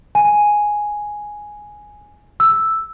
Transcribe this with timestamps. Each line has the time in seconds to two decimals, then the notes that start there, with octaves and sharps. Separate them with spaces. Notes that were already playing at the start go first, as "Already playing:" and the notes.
0.15 G#5
2.40 E6